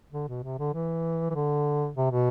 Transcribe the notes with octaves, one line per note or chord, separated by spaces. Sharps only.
D3
B2
C3
D3
E3
E3
D3
C3
B2